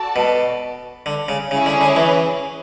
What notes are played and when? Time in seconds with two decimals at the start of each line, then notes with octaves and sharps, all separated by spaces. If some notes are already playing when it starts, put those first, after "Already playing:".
Already playing: F#4 A4 D5 A5
0.16 B2
1.06 D3
1.28 C#3
1.51 C#3 C#4 E4 G#4 C#5
1.66 D3
1.81 D3
1.96 E3